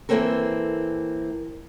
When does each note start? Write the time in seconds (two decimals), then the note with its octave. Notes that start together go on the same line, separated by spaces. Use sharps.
0.09 E3 G3 A#3 C4 A4 A#4